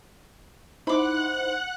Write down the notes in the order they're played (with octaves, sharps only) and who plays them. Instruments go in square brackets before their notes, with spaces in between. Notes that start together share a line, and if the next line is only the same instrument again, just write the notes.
[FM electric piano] D#4 E4 C5 [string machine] F#5 F#6 [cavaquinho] B5 D6